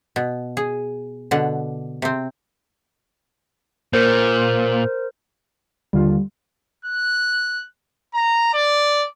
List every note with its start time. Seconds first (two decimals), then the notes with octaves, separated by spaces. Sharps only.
0.16 B2
0.57 G#4
1.31 B2 D3 F#5
2.02 C3 C4
3.93 A#2 A#4 C5
5.93 D#2 D3 G3 F4
6.85 F#6
8.14 A#5
8.53 D5